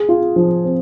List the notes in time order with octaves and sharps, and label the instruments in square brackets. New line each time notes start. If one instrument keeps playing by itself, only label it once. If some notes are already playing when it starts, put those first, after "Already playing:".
Already playing: [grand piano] G#4
F4
F3
C4